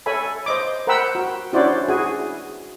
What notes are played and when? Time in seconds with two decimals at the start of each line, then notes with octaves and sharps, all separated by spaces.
0.06 A4 C#5 E5 G#5 B5
0.46 C5 D#5 D6
0.87 A#4 C5 F#5 G5 B5 E6
1.15 F#4
1.53 C#4 D4 E4 F#4 C5 D5
1.88 E4 F#4 G#4 G#5